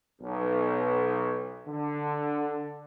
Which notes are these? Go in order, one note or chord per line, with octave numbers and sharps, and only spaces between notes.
B1
D3